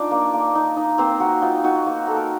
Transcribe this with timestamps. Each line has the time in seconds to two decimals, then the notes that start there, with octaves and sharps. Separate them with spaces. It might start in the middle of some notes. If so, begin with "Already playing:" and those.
Already playing: D4 D#4 F4 D5
0.11 A#3
0.33 A#3
0.55 D#4
0.77 D#4
0.98 A#3 C4 C5
1.20 A#3 F#4
1.42 D#4 F4
1.64 D#4 F#4
1.86 A#3
2.07 A#3 A4
2.16 A#4